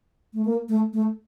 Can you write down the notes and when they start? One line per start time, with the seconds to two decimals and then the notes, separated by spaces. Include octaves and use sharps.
0.34 A3
0.45 A#3
0.69 A3
0.93 A3